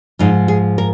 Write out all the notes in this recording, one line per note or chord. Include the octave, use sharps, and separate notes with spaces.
G#2 F3 D#4
G#4
A#4